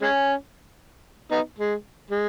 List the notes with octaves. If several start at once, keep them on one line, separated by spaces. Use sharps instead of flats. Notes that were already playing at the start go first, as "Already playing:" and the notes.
G#3 C#4
B3 D#4
G#3
G#3